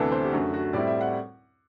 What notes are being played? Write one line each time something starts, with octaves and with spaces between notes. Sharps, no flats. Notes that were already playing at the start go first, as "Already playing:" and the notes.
Already playing: D2 C3 E3 B3 D4 A4
C5
G4
F#2 D3 A3 F#4
F#4
A2 G3 C4 E4 D5
E5
F#5